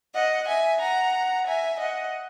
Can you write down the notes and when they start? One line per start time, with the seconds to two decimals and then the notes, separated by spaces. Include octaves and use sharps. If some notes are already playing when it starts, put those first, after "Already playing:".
0.15 D#5 F#5
0.48 E5 G#5
0.81 F#5 A#5
1.47 E5 G#5
1.79 D#5 F#5